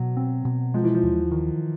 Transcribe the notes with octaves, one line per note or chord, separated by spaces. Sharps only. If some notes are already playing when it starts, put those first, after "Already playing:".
Already playing: B2 F#3
C4
B2
F3 G#3
E3
F3
D#2
D#3